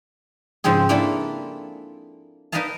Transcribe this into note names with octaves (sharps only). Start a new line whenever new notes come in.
G#2 C#3 F3 C4 G#4
A#3 D4 E4 F4 G#4 A4
D#4 A#4 B4 D#5 F5 A5